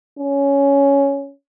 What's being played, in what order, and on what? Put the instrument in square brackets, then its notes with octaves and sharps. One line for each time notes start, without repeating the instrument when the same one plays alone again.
[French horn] C#4